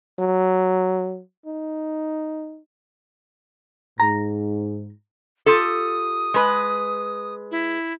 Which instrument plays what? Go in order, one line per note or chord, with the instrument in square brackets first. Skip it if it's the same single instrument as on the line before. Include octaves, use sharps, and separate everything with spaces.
[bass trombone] F#3
D#4
[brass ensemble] G#2 [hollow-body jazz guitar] A#5
[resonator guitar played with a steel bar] F4 G4 A4 [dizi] D#6
[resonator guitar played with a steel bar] G#3 B4
[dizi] E4